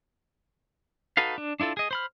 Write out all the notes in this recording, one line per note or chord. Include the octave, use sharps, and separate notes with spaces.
D#4 F#4 A4 B4 F5
D4
D4 E4 F4 A4
G#4 D#5
C5 B5 F6